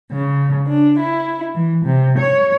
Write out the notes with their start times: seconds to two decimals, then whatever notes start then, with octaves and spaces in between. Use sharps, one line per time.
0.11 C#3
0.67 D4
0.99 E4
1.54 E3
1.84 C3
2.18 C#5